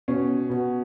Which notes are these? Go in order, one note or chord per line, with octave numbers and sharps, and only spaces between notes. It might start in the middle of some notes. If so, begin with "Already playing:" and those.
B2 C#4
B2